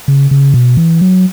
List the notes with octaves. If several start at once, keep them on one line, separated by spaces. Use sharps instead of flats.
C#3
C#3
B2
E3
F#3